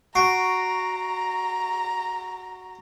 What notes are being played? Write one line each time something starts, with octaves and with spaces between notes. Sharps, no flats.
F#4 A#5 C#6 C7 D7